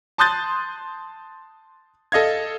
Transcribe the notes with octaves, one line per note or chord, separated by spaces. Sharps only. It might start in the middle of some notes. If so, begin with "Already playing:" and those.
A5 C6 D#6 F#6 G6 A6
A4 D#5 F5 G#6